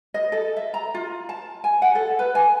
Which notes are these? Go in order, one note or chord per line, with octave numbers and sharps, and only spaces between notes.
D#5
A4
E5
A#5
F4
A5
G#5
F#5
A4
B4
G#5